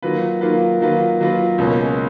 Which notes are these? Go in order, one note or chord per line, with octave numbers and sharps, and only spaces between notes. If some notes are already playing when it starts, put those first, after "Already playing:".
D#3 F#3 A#3 F4 B4
D#3 F#3 A#3 F4 B4
D#3 F#3 A#3 F4 B4
D#3 F#3 A#3 F4 B4
C#2 B2 A#3 C#4